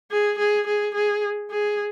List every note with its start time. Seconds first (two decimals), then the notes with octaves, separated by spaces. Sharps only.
0.11 G#4
0.38 G#4
0.67 G#4
0.94 G#4
1.51 G#4